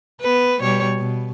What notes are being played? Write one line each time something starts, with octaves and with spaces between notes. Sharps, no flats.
B3 B4
B2 G3 C#5
B2